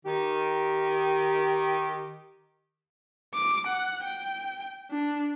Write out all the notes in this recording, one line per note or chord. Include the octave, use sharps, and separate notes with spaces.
D#3 G4
D6
F#5
G5
D4